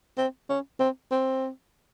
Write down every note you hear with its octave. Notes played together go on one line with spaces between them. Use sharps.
C4
C#4
C4
C4